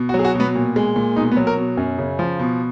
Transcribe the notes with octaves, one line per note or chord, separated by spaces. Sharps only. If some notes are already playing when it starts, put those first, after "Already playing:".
Already playing: B2
F#4
F#3
G#4
F#4
B2
B3
A#2
G#3
A#2
B2 D#4
B3
F#3
A#4
B2
F#2
C#3
F3
B2